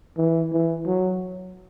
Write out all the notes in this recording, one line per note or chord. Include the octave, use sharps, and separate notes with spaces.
E3
E3
F#3